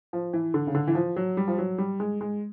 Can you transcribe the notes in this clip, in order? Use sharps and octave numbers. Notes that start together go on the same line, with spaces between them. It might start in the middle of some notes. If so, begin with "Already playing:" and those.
F3
E3
D3
C#3
D3
E3
F3
F#3
G3
F3
F#3
G3
G#3
G#3